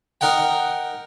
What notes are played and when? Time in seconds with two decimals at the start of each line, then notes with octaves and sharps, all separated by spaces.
0.21 D#4 A#4 D#5 F#5 G5